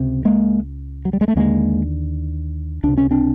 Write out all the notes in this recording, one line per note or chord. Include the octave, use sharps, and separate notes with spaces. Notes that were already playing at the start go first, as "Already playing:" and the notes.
Already playing: C#2 C3
G#3 A#3
F#3
G3
G#3
A3
D#2 D3 G#3 A#3
C#2 C3 D4
C#4
C4 D4